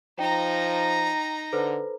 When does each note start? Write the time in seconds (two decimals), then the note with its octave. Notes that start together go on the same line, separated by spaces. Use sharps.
0.19 F3 D#4 G5 A#5
1.53 D3 A4 B4 C5